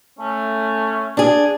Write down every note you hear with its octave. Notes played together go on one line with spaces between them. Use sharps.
A3 C#4
D4 G#4